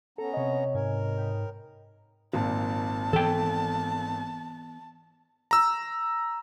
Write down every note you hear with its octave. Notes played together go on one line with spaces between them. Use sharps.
B3 C#4 A4 A#5
C3 C#5 D#5 B5
B4
G#2 A#4 G#5
G5 B5 D#6
G#1 A#2 A5
E3 B3 A4 G5
A#5 E6